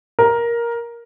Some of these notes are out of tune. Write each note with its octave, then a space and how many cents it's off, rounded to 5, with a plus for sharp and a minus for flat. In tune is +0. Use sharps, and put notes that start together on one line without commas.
A#4 +10